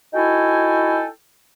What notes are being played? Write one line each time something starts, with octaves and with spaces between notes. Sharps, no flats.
D#4 E4 F#4 A4 G5 G#5